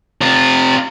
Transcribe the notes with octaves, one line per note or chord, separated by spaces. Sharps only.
C3 F4